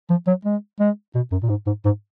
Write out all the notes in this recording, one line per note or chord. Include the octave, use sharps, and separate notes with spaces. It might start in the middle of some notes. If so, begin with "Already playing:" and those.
F3
F#3
G#3
G#3
B2
F#2
A#2
G#2
G#2
G#2